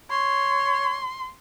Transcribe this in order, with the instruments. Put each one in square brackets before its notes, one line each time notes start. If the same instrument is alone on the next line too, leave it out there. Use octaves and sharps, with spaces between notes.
[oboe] C#5 [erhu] C6